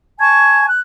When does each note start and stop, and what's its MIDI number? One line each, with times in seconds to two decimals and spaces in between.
0.19 0.67 80
0.19 0.67 81
0.19 0.67 85
0.19 0.67 92
0.69 0.79 90